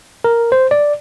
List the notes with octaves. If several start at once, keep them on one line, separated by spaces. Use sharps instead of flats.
A#4
C5
D5